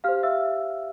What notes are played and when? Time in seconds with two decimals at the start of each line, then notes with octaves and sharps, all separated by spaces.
0.04 G4 C5 F5 F6
0.23 E5 E6